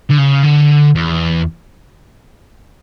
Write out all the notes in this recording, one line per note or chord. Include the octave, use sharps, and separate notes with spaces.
D3
C#3
D3
E2